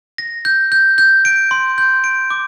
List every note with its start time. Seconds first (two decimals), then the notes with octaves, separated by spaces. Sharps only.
0.18 A#6
0.45 G6
0.72 G6
0.98 G6
1.25 D7
1.51 C6
1.78 G6
2.04 D7
2.30 D6